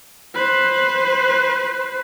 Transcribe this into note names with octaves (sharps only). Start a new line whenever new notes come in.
B4 C5